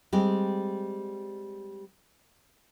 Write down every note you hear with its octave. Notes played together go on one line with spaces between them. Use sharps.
G3 G#3 C4